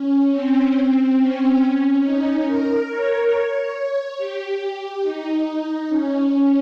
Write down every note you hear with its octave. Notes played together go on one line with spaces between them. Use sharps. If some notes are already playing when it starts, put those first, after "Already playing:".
Already playing: C#4
C4
C#4
D#4
A#4
C#5
C#5
G4
D#4
C#4